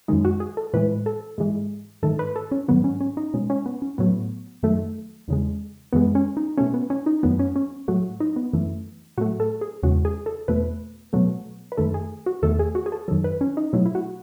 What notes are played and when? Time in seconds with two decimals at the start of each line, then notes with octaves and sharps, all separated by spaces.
0.08 F#2 D#3 G#3 D#4
0.25 F#4
0.40 G#4
0.57 A4
0.74 A2 E3 G#3 B4
1.06 A4
1.38 G#2 E3 G#3
2.03 G#2 D#3 A3 A4
2.19 B4
2.36 A4
2.51 C#4
2.68 G#2 D#3 F#3 B3
2.84 C#4
3.00 C#4
3.17 D#4
3.34 B2 G#3 C#4
3.50 C#4
3.66 B3
3.82 C#4
3.98 A2 F#3 A3 B3
4.63 F#2 D#3 F#3 A3
5.28 E2 C#3 G#3
5.93 F#2 E3 G#3 B3
6.15 C#4
6.37 D#4
6.58 B2 A3 C#4
6.74 B3
6.90 C#4
7.06 D#4
7.23 F#2 D#3 F#3 A3 B3
7.39 C#4
7.56 C#4
7.88 A2 F#3 A3 F#4
8.20 D#4
8.36 B3
8.53 F#2 E3 A3
9.17 A2 F#3 A3 F#4
9.40 A4
9.61 G#4
9.83 E2 C#3 G#3 F#4
10.05 G#4
10.26 A4
10.48 E2 B2 A3 B4
11.13 B2 F#3 A3
11.72 B4
11.77 F#2 D#3 A3 A4
11.94 G#4
12.26 F#4
12.42 E2 D#3 A3 A4
12.59 G#4
12.75 F#4
12.86 G#4
12.92 A4
13.08 F#2 D#3 F#3 A4
13.24 B4
13.41 C#4
13.57 D#4
13.73 B2 F#3 A3 E4
13.86 E4
13.95 F#4